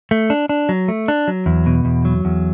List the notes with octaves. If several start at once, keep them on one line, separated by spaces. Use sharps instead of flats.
A3
D4
D4
F#3
A3
D4
F#3
E2
B2
E2
F#3
E2